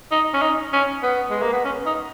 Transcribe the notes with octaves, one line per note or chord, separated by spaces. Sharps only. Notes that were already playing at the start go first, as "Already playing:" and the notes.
D#4
C#4
D#4
C#4
B3
G#3
A#3
B3
C#4
D#4